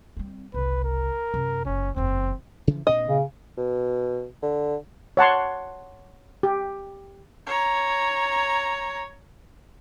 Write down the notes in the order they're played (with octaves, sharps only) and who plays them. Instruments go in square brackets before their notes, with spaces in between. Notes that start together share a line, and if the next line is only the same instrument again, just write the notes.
[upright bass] G3 C4
[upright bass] F#1 C2 [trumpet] B4
[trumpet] A#4
[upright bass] F#2 C3
[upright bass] F#1 F4 [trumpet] C#4
[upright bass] F#1 E2 [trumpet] C4
[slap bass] C#3 E3 F3
[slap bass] A#2 C4 D4 [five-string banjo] D#5
[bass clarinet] C#3
[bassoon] B2
D3
[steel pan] C#5 F#5 A5 C6
G4
[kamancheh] C#5 A#5